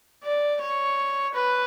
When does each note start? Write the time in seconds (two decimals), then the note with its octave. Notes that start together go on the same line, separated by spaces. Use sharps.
0.24 D5
0.61 C#5
1.34 B4